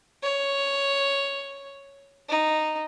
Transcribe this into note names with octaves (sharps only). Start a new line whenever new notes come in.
C#5
D#4